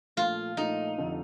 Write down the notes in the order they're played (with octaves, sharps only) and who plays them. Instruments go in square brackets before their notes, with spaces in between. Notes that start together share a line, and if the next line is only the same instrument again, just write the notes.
[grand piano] A#2 F3 A3 [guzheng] F4
[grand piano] A#2 F3 A3 [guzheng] D#4
[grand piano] F1 F2 D3